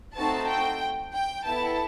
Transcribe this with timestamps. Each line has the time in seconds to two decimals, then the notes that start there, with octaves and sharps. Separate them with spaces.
0.16 A3 C4 D#4 F#4 A4 A5
0.49 G5
1.13 G5
1.45 B3 E4 A4 A5